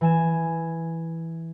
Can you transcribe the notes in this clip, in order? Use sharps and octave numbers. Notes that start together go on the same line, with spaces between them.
E3 G#5 E7